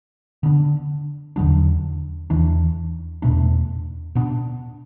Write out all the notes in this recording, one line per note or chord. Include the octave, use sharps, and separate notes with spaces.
D3 B3 D4
E2 D3 F#3 D4
E2 E3 D4
E2 B2 A3 D4
B2 B3 D4